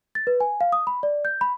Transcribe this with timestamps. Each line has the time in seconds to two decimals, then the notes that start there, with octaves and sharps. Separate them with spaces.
0.15 A6
0.27 B4
0.40 G#5
0.61 F5
0.72 D#6
0.87 B5
1.03 D5
1.25 G6
1.41 B5